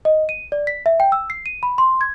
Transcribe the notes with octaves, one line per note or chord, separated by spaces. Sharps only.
D#5
D#7
D5
B6
E5
G5
E6
C7
D#7
B5
C6
G#6